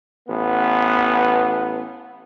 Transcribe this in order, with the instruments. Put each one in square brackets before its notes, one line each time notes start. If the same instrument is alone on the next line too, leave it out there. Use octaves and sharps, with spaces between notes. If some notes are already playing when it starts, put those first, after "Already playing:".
[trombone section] A1 B3